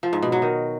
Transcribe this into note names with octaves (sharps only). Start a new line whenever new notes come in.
F3
G#2
B2
F#3
D#3